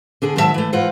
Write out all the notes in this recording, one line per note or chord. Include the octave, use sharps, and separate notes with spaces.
D3 D4 G#4
G#2 D#3 F#3 E4 E5 A5
E3 A3
G#2 E3 F4 C5 F#5